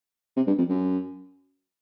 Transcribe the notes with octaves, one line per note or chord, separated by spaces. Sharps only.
C3
G2
F2
F#2